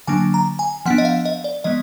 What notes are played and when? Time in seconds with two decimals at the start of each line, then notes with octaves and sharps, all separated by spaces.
0.07 D3 F#3 A#3 D4 G#5
0.34 A#5
0.59 G#5
0.86 F3 B3 D4 F#5
0.98 D#5
1.05 F5
1.25 D#5
1.44 D5
1.64 F3 G#3 B3 D#5